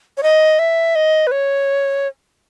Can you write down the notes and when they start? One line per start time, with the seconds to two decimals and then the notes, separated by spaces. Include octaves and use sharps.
0.17 C#5
0.23 D#5
0.59 E5
0.95 D#5
1.27 B4
1.31 C#5